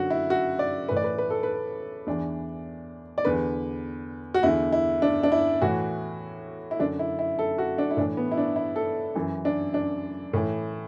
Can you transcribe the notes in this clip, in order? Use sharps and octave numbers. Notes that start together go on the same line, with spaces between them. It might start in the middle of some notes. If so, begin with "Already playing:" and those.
Already playing: F#2 D3 F#4
E4
F#4
D5
A2 E3 B4
D5
B4
B4
A4
B4
E2 E3 D4
D5
E2 D3 B4
F#4
E2 D3 E4
E4
D4
D4
E4
A2 E3 F#4
E4
F#2 D3 D4
E4
E4
A4
F#4
D4
E4
A2 E3 D4
B3
E4
D4
E4
A4
F#2 E3
D4
D4
A2 E3